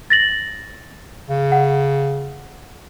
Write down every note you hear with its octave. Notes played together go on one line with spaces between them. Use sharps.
A6 A#6 F#7
C#3
F#5